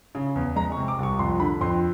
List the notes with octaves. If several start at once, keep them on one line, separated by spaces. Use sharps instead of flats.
C#3
E2
G#3 A#5
C#6
C3
D6
C2 C#6
F2 C6
D3 B5
F2 C6